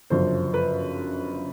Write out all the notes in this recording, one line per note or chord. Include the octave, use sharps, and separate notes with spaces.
G1 F#2 C#3 F3 C5
B4